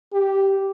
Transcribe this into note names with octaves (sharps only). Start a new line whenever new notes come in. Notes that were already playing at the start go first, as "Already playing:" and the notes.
G4